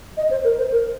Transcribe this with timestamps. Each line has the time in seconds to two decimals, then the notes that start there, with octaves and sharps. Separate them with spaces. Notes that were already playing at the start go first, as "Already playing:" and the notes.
0.17 D#5
0.31 C5
0.44 A#4
0.58 C5
0.72 A#4